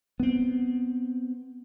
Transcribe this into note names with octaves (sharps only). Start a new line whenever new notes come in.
B3 C4